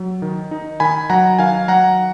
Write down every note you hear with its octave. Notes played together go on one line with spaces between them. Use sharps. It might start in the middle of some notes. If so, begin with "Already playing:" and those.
Already playing: F#3
D#3
D#4
D#3 G#5 B5
F#3 F#5 A#5
D#3 F5 G#5
F#3 F#5 A#5